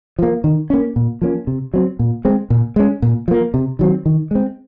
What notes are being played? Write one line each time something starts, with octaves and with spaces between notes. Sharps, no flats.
F3 A#3
D#3
A#3 C#4
A#2
F3 A#3 C#4
C3
F#3 C4
A#2
G#3 C4
A#2
G#3 C#4
A#2
F3 A#3
C3
D#3 F#3 C4
D#3
G#3 C4